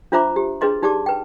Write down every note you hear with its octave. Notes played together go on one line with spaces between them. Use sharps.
D4 F4 C5 E5 A#5 D6
G4
D4 G#4 B4 D#5 C6
D#4 G4 D5 A5 D6
B4 G5